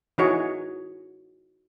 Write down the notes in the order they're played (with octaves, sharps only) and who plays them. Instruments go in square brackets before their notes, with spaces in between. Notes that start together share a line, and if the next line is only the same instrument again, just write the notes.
[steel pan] E3 D#4 F#4 G#4 C#5